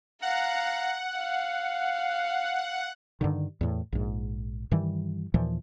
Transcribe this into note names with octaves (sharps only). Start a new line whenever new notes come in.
F5 F#5 A#5
F5
G2 D3 D#3
E2 A2
A#1 G#2
G2 D#3 E3 G3
D#2 A#2 E3 F3